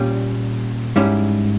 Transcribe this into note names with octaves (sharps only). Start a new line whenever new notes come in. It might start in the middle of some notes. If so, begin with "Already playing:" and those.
Already playing: A#2 G3 C#4
G#2 G3 C#4 E4